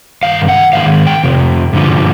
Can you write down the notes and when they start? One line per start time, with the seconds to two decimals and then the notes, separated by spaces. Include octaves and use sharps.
0.23 G2 D#3 F5
0.48 F#5
0.73 G#2 D#3 G#3 F5
1.07 G5
1.23 F2 C3
1.73 G2 D3 F3